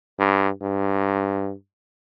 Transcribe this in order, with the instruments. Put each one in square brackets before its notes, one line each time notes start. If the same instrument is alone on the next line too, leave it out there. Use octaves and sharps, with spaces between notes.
[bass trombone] G2
G2